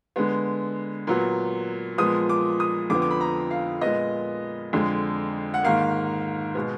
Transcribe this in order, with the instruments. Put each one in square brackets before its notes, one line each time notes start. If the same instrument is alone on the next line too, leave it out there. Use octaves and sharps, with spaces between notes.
[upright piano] D3 G#3 B3
A#2 F#3 B3
A#2 F3 G#3 B3 D#6
D6
D#6
F2 D3 F3 B3 D6
D6
B5
A#5
F5
A#2 G#3 B3 D#5
F2 D3 G#3
F#5
G#2 D#3 A#3 F5
B2 G#3 B3